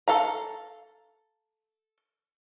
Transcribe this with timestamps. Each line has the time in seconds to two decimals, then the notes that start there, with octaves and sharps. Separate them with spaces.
0.08 A4 F5 A#5